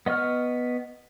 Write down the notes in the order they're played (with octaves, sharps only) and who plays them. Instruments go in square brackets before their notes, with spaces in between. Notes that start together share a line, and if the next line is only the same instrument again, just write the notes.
[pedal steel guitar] B3 D#5 C#6 F6